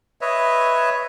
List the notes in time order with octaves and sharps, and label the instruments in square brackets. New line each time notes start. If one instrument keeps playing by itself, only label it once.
[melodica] B4 C#5 D#5 E5